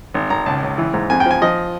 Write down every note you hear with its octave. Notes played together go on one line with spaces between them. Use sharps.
G#1
G#1 A#5
C#2 A5
C#2
E3
G#2
F2 G#5
G5
F3 G#5
F3 D#5